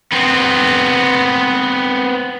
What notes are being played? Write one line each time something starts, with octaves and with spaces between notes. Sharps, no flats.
B3 C4